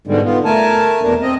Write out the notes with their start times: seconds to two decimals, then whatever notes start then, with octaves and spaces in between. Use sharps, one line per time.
0.07 G#2 B2 D3 G3 G#3
0.25 B3 F4
0.45 A3 A#4 G#5 A5
1.02 E2 B2 D4 A#4
1.22 C4 D#5